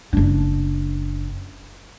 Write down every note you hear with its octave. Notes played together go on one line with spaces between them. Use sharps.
F#1 D4